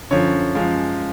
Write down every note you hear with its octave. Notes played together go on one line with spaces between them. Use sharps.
F#2 D3 F3 C#5
F#2 F3 G#3 F5